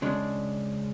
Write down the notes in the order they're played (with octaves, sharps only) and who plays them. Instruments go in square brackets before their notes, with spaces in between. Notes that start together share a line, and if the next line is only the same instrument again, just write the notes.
[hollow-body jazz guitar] C#3 G#3 D4